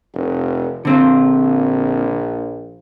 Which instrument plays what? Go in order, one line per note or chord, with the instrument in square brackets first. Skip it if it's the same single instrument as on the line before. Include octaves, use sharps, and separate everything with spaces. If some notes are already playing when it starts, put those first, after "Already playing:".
[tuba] F1
[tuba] A#1 [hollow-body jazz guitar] D3 C4 F4